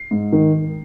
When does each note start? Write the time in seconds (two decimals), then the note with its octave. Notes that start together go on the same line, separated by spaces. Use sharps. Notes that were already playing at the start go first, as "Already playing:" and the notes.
Already playing: C7
0.11 G#2
0.32 D#3